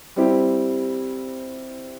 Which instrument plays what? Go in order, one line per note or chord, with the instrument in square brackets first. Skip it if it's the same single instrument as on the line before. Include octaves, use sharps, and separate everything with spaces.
[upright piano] G3 C4 E4 G4